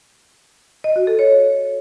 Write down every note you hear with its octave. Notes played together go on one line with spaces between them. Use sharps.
D#5
F#4
A4
C#5